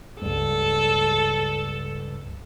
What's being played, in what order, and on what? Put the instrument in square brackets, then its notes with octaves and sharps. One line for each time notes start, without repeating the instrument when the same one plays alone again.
[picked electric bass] C#2 G2 [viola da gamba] A4